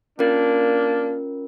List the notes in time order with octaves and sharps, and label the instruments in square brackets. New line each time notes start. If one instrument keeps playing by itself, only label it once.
[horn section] A#3 D4 [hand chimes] C#4 F4 A#4